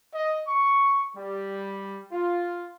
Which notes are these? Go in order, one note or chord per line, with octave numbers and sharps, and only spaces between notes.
D#5
C#6
G3
F4